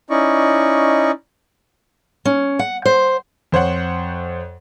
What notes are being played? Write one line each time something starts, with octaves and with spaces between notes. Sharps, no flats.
C#4 D#4 E4 D5 D#5 C#6
C#4
F#5
C5
F2 C5 C#5 F#5